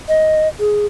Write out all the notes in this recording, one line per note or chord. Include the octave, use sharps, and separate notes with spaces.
D#5
G#4